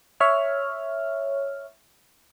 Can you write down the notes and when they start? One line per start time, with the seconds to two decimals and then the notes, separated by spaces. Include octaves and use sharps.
0.20 C#5 E5 F6